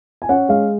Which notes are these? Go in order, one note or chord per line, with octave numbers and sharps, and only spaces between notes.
G#5
C#4 F#5
G#3 F5